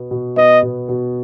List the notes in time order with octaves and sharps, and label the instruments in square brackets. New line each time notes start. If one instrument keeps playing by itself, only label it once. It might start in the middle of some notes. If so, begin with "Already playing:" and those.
Already playing: [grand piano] B2 B3
B2
[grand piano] B3 [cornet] D#5
[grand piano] B2
B2